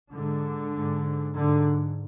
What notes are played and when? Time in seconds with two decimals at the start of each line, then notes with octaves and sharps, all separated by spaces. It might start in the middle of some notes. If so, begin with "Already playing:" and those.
0.12 G#2 D3
0.74 G#2
1.36 G#2 D3